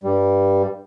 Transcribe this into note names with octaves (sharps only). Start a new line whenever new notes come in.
G2 G3